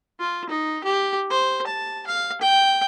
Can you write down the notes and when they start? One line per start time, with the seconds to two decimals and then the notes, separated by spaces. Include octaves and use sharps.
0.20 F4
0.49 D#4
0.84 G4
1.30 C5
1.67 A5
2.07 F5
2.41 G5